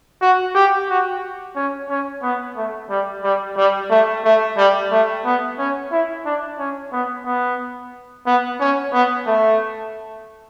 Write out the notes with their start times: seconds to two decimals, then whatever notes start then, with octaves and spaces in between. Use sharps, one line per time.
0.22 F#4
0.55 G4
0.89 F#4
1.56 C#4
1.89 C#4
2.23 B3
2.57 A3
2.90 G3
3.24 G3
3.57 G3
3.90 A3
4.24 A3
4.57 G3
4.91 A3
5.25 B3
5.58 C#4
5.91 E4
6.25 D4
6.59 C#4
6.92 B3
7.26 B3
8.26 B3
8.60 C#4
8.93 B3
9.26 A3